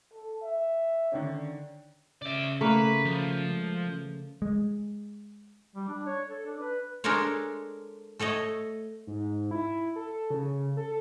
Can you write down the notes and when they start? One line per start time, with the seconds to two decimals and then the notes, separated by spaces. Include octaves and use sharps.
0.13 A4
0.43 E5
1.12 D3 D#3 C#4
2.22 C#3 D5 E5
2.61 A3 A#3 B4
3.05 F3
3.49 G#3
3.85 C#3
4.42 G#3
5.76 G3
5.89 D4
6.06 C#5
6.28 A4
6.46 D4
6.60 B4
7.04 G#3 D4 A4 A#4 C5 C#5
8.19 A3 A4 C#5 D#5
9.07 G#2
9.51 E4
9.96 A4
10.30 C#3
10.77 A4